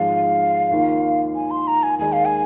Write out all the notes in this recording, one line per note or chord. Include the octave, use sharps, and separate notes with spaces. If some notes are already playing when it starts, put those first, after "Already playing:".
Already playing: G#1 G#2 F3 G#3 F5
D#2 D#3 A#3 F4
G#5
C6
A#5
G#5
D#2 D#3 G#3 D#4 G#5
F5
G#5